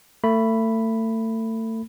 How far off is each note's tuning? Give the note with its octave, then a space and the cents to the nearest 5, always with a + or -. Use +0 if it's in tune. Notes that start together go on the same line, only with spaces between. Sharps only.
A3 +30 B5 +0